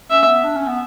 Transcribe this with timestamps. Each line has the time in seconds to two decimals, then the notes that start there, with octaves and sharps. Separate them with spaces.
0.10 C#4 E5
0.27 B3
0.44 D4
0.55 C#4
0.67 B3